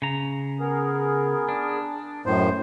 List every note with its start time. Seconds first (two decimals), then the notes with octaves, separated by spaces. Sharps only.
0.02 C#3 A#5
0.60 B3 G#4 A#4
1.49 D4
2.26 F#2 A2 D#3 B3 C5